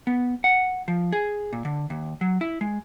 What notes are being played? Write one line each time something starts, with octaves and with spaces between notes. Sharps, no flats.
B3
F#5
F3
G#4
A#2
D3
D#2
F#3
E4
G#3